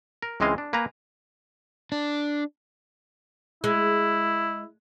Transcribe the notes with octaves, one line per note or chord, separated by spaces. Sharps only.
A#4
C#2 E3 G#3 C4 D#5 F5
D4
A#3 B4 G#5 A#5
D4
G#3 E4